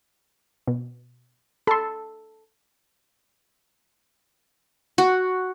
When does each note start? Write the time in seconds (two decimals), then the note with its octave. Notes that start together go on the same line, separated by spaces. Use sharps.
0.68 B2
1.67 A4 B5 C6
4.98 F#4